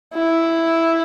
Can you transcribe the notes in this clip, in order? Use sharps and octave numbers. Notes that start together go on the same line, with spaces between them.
E4